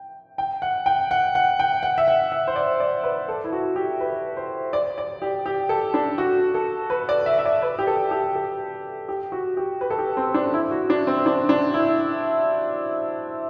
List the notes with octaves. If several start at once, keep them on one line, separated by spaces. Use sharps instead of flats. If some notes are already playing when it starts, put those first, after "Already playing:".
Already playing: G5
G5
F#5
G5
F#5
F#5
G5
F#5
E5
F#5
E5
C5
D5
D5
B4
A4
E4
F#4
G4
B4
C5
D5
D5
G4
G4
A4
D4
F#4
A4
B4
D5
E5
E5
D5
B4
G4
A4
G4
A4
G4
F#4
G4
B4
A4
G4
C4
D4
E4
F#4
D4
C4
D4
D4
E4